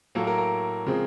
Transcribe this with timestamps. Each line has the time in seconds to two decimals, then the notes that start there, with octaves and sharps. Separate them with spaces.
0.15 A2 F#3 A#3 A4
0.27 A#4
0.38 A#4
0.86 C#3 F3 G#3 C4